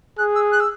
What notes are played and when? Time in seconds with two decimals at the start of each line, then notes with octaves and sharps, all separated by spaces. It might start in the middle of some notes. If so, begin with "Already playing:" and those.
0.18 G#4 F#6
0.35 E6
0.52 F#6
0.60 E6